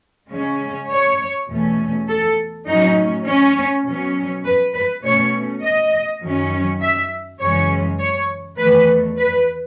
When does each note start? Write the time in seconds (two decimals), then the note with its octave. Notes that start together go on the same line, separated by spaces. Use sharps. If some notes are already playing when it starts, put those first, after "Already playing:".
0.30 C#3 G#3 C#4
0.89 C#5
1.49 E2 B2 A3 C#4
2.08 A4
2.67 A2 F#3 C#4 D#4
3.26 C#4
3.85 B2 F#3 C#4
4.44 B4
4.74 B4
5.03 B2 A3 C#4 C#5
5.62 D#5
6.21 F#2 D#3 F#3 C#4
6.81 E5
7.40 F#2 C#3 E3 G#3 C#4 C#5
7.99 C#5
8.58 E2 D#3 A3 B4
9.17 B4